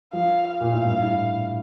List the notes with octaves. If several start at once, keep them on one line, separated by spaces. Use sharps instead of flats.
F3 F5
F5
A#2
A2
G2
A2